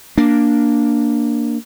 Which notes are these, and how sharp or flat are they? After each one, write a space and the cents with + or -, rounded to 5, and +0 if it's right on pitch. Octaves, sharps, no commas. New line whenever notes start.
A#3 +0 D4 +0